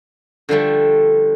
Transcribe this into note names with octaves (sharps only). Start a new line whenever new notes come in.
D3 F3 G3 A3